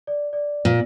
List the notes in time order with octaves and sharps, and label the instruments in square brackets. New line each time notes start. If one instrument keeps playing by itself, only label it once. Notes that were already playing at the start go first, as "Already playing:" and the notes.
[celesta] D5
D5
[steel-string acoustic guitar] A#2